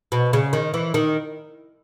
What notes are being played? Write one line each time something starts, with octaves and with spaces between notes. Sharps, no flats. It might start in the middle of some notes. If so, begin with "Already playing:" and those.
B2
C#3
D#3
E3
D#3